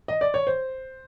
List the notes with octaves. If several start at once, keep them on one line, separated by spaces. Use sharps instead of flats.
D#5
D5
C#5
C5